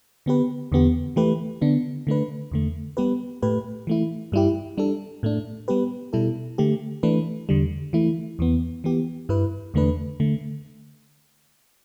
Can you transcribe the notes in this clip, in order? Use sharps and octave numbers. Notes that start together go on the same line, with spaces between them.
D3 B3 G4 B4
E2 D3 B3 G4
E3 A3 G4 B4
D3 B3 D4
D3 A3 D4 B4
E2 D3 A3
G3 B3 G4 B4
A2 A3 G4 B4
E3 A3 E4
G2 G3 E4 G4
G3 D4 A4
A2 A3 D4
G3 B3 G4 B4
B2 G3 E4 A4
D3 A3 G4
E3 A3 D4 B4
E2 D3 G3
E3 A3 E4
E2 E3 B3
E3 B3 G4
G2 G3 E4 B4
E2 D3 A3 D4 B4
D3 A3